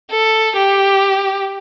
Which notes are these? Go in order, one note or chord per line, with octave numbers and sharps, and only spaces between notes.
A4
G4